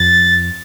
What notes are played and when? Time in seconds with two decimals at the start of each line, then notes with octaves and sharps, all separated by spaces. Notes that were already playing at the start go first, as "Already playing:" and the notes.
Already playing: F2 A6